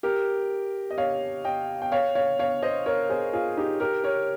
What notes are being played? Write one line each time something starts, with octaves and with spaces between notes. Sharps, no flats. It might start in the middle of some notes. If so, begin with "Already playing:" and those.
G4 A#4
D#5
C#5 F5
D#5 G5
G5
C#5 F5
C#5 F5
C#5 F5
C5 D#5
A#4 C#5
G#4 C5
F4 G#4
D#4 G4
G4 A#4
A#4 C#5